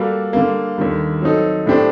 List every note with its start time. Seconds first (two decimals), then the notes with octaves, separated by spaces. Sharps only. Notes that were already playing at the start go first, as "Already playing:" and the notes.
Already playing: G3 A#3 F#4 A4
0.33 D3 G3 A#3
0.78 D#2 D3 G3
1.22 F#3 C4 D#4 A4
1.66 A2 A3 D4 G4 C5